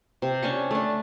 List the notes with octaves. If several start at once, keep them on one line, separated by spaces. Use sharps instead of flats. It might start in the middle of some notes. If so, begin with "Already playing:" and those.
C3
C#4 D4 G#5 C#6
A3 D4